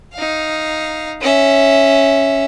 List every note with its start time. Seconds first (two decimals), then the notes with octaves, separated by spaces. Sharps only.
0.14 D#4 F5
1.21 C#4 E5